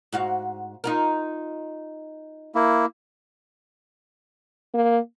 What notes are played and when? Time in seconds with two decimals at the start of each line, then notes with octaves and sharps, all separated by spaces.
0.12 G#2 F#4 F5
0.84 D#4 F4 A#4
2.55 A#3 E4
4.74 A#3